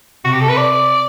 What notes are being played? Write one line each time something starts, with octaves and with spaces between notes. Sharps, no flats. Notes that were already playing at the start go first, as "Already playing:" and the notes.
C3 F#4
G4
A4
B4
D5